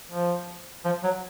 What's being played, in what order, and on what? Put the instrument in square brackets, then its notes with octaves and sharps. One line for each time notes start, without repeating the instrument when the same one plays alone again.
[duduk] F3
F3
F#3